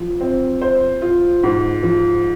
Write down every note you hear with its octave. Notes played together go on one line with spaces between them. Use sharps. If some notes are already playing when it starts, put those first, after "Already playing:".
Already playing: F3
C4
C5
F4
G#2
F3